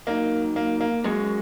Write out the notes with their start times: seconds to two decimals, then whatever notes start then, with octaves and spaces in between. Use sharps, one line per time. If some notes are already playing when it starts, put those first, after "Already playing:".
0.07 F#3 A#3 D#4 A#4 D#5
0.56 A#3
0.81 A#3
1.04 F#3 G#3 C#4 F#4 A#4 C#5